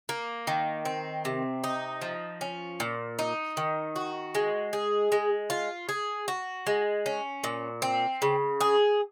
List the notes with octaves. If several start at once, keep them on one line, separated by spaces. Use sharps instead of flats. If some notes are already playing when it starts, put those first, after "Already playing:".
A#3
D#3
C4
C3
D#4
F3
C#4
A#2
D#4
D#3
F#4
G#3
G#4
G#3
F4
G#4
F#4
G#3
C#4
A#2
C4
C#3
G#4